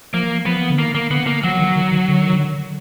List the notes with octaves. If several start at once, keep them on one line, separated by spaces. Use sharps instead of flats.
F3 A#3
F3 B3
D3
D#3 A#3
A#3
D3 B3
A#3
F3 F#3
D#3
D#3
D#3
D3
D#3
D3